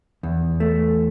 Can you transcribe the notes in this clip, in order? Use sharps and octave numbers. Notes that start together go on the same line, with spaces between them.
E2
A3